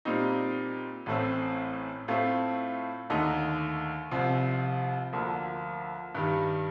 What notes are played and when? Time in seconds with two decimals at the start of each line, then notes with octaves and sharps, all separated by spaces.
0.05 A#2 G3 C4 D#4
1.06 A1 A2 A3 C4
2.08 A2 A3 C4 F4
3.10 D#2 D3 A3 D#4
4.11 C2 C3 F3 C4
5.13 D2 D3 F3 A#3
6.15 G2 D#3 G3